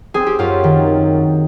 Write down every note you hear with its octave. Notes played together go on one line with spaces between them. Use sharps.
C4 G#4
G4
F#2 F4
D#3